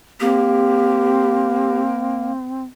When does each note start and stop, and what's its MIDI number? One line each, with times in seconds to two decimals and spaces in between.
0.20 2.32 58
0.20 2.64 60
0.20 1.81 67